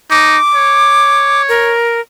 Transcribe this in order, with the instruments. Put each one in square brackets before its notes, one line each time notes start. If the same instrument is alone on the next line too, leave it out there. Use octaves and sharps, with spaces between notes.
[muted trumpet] D#4 [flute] D6
[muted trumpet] C#5
[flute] A#4